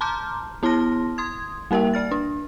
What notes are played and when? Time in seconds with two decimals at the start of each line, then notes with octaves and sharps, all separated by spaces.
0.01 A5 A#5 C6 D6 F6 G6
0.63 B3 E4 A5 C6 F6 A#6
1.18 C6 D#6 G#6
1.71 G3 A#3 A#4 E5 G5
1.94 D5 F6 A6
2.11 D4